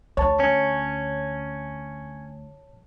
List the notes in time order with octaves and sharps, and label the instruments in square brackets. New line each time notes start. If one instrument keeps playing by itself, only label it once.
[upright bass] D2 [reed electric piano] C#5 A5
[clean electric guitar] C#4